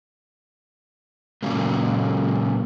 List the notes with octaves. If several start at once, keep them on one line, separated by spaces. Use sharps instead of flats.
A#2 C#3 F#3 A#3